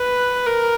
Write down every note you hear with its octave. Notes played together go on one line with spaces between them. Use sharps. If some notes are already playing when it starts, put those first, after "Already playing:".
Already playing: B4
A#4